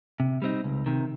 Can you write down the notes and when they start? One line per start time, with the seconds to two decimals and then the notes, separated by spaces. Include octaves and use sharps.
0.20 C3
0.42 G3 C4 D#4
0.64 C#2
0.86 C3 D#3